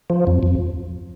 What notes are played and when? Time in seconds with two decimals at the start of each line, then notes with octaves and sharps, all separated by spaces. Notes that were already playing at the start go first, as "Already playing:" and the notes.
0.10 F3
0.27 F2
0.43 F2